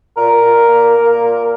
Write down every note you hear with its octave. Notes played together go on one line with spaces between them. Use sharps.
A#2 A#4
A#2
A#3
A#3
A#2